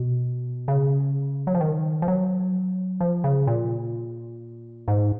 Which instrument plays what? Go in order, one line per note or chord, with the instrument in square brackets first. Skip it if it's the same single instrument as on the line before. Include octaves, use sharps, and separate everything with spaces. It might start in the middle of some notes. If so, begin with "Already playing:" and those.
Already playing: [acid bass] B2
C#3
F#3
F3
D#3
F3
F#3
F3
C#3
A#2
G#2